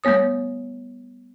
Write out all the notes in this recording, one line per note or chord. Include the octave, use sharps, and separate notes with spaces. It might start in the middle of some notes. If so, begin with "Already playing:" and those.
G3 A3 B3 C#5 D#6